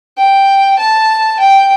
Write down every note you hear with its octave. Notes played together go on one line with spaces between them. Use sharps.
G5
A5
G5